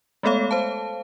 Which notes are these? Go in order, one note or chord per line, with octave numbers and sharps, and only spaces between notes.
G#3 A3 B3 A4 C#5 F5
C5 F5 A5